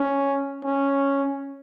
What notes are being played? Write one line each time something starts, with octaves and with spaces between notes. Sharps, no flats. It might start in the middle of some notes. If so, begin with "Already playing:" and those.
Already playing: C#4
C#4